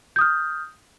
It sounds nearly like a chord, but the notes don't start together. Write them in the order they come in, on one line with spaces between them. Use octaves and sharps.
G6 D#6 F6